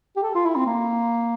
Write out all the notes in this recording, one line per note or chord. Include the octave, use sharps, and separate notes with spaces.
G4
A4
F4
E4
C4
A#3